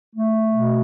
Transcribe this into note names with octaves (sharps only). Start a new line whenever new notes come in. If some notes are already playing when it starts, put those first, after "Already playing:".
A3
B2